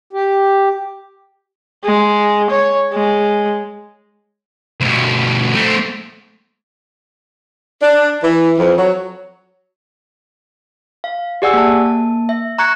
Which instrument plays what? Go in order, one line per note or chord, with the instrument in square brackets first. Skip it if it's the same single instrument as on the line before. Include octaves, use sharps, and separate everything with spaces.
[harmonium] G4
[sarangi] G#3
C#5
G#3
[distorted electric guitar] D2 B2
A3 C4
[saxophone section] D4
E3
F2
F#3
[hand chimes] F5
G4 G#4 D5 F#5 G#5 E6
A#3 A5
E5
A#5 C#6 F#6 G#6 C#7